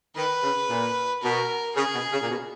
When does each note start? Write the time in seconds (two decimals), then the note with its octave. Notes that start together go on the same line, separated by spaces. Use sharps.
0.16 D#3 B4
0.43 C#3
0.70 A#2
1.23 B2 A#4
1.76 C#3 G#4
1.94 B2
2.12 C#3
2.22 A#2
2.30 B2